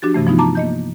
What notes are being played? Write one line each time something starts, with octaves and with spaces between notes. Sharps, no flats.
F3 D4 F#4 G4 A6
G2 C3 E3 A3
F3 B3 D#4 F4
A5 A#5 D6
A#3 D#5 G6